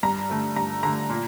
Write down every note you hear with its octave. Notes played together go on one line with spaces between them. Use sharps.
G2 A#5
D3 A3
G2 A#5
D3 A3 A#5
A#2